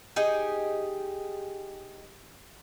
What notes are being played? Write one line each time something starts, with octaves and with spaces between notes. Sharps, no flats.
D#4 G4 G#4 D#5